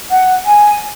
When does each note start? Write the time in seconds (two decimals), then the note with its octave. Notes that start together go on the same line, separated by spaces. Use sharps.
0.11 F#5
0.46 G#5